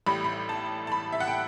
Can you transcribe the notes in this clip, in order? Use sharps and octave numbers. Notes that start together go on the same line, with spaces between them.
A1 A2 G3 B5
B5
A5
A5
B5
E5
F#5
G5